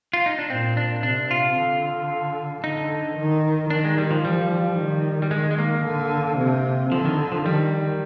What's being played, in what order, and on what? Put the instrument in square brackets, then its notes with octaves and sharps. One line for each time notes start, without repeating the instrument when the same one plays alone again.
[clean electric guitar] F4
D#4
D4
[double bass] A#2 [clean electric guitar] C4
[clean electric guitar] D4
[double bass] C3 [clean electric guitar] D4
[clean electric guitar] F4
[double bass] D3
[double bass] D3 [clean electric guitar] D#4
[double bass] D#3
[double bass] D#3 [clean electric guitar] D4
[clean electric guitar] G#3
G3
F3
[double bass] F3 [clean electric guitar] G3
[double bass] D#3
[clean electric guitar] G3
[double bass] D#3 [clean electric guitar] G#3
[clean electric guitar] G#3
A#3
[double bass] D3
C3
[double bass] D3 [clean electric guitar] F3
[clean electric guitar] D#3
F3
[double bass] D#3 [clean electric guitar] G3